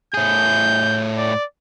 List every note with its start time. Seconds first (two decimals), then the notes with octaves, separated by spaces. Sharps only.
0.14 A2 G#4 G6
1.18 D5